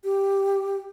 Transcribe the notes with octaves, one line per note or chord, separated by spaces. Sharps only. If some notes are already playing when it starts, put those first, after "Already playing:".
G4